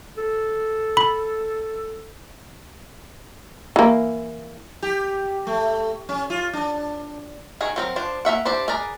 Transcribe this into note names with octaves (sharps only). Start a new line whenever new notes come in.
A4
B5
E3 A#3
G4
A3
C#4
F4
D4
D#3 F#4 G#4
F#3 C4 A#4
F3 D4 C5
A#3 F#4 E5 F#5
D4 E4 G4 C5
G#4 A#4 B4 D5 A#5